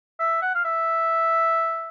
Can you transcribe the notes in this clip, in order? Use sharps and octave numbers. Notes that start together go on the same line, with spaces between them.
E5
F#5
F5
E5